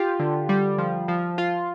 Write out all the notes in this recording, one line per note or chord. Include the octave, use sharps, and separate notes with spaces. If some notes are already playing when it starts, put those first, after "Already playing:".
Already playing: F4 G4
D3
G3
F3
F3
F4